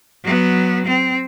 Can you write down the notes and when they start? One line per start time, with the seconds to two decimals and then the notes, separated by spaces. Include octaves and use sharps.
0.23 F#3 B3
0.86 C4